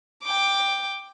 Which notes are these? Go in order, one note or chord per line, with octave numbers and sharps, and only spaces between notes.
G5 D6